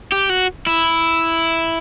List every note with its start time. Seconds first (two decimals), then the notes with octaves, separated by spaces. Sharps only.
0.12 G4
0.29 F#4
0.67 E4